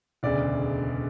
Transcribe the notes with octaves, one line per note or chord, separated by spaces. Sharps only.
E1 D2 C#3 D5